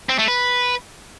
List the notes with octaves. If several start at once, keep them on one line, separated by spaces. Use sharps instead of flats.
C4
A3
B4